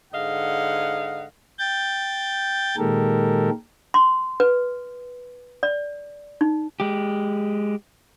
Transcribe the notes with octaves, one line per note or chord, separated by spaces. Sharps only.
G#2 D3 D#5 F5 F#5
G5 G6 A6
A#2 D#3 G#3 G4 A4 A#4
C6
B4
D5
D#4
G#3 G4